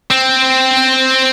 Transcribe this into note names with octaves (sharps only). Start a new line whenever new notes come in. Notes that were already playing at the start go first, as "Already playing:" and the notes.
C4